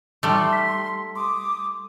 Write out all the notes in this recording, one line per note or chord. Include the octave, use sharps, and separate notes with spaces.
G3 A3 D#4 A4 C6
B6
C6 D6 D#6